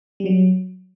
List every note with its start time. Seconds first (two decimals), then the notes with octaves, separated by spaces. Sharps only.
0.20 G3
0.26 F#3